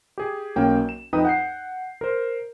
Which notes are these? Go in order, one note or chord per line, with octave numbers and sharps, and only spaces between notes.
G4 G#4
B1 A#3 C#4 G5
E7
F2 D#4 B4 G5 D#6
F#5 G6 C7
A#4 C5